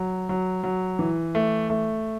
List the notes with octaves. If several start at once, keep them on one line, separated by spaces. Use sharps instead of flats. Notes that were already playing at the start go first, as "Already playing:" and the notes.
Already playing: F#3
F#3
F#3
E3
A3
A3